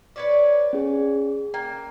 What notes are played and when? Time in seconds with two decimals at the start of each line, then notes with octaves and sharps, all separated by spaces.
0.16 B4 C#5 D5
0.73 C#4 G#4
1.54 A#3 G5